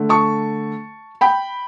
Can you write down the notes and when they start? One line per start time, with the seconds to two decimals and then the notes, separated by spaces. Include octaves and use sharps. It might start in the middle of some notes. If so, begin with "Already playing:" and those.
Already playing: D3 A3
0.09 A5 C#6
1.21 G5 B5